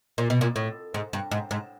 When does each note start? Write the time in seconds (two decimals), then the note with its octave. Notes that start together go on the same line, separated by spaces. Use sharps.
0.18 A#2
0.30 B2
0.41 A#2
0.56 A2
0.94 G#2
1.13 G2
1.31 G#2
1.51 G#2